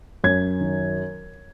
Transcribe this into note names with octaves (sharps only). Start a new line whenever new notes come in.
F#2 G#6
D#3